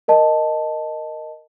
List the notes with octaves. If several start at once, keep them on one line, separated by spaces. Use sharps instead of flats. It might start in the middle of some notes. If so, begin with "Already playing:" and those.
A#4 D#5 A5